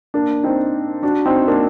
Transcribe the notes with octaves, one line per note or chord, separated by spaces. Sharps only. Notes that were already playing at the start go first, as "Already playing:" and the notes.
A#3 D4
C4 D#4
D4 F#4
C4 D#4
A#3 D4